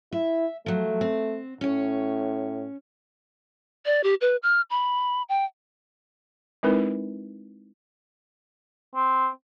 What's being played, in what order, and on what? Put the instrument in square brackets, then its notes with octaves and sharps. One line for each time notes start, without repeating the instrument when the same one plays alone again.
[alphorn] E4 [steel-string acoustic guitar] E5
[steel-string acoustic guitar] F3 F#3 [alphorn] A3
[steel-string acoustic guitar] C4
[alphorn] A2 [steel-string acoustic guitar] C#4 C#5
[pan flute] D5
G4
B4
F6
B5
G5
[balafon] G#3 C4 D#4 E4 A#4 B4
[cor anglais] C4